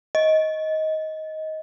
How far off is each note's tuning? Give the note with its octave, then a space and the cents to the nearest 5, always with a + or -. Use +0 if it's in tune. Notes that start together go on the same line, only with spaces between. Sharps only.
D#5 +15